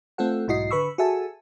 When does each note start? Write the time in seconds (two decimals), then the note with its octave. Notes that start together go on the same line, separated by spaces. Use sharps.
0.18 A3 C4 F4 A4 F#5
0.48 B1 G#2 E4 F#4 D#5 C7
0.71 D3 B4 B5 C#6 E6
0.98 F#4 G#4 A4 E5 G#5 A5